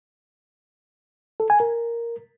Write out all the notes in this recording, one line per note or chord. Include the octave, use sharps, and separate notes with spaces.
A4
G#5
A#4